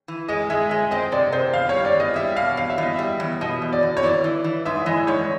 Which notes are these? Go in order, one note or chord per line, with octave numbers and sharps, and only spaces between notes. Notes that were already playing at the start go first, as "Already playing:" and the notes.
E3
G#3 D#5
G#3 E5
G#3 E5
C4 D#5
C3 D5
C3 C5
E2 F5
G3 C#5
D5
E2
D#5
G3 E5
B2 F5
E2 F5
E5
E2 D#5
G3 E5
E2
B2 D#5
E2
D5
E2
C#5
E3 D5
E3
E3
G#2 E5
E3 D#5
G#2 C#5